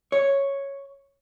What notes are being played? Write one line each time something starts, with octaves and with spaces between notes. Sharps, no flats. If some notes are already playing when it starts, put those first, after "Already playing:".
C#5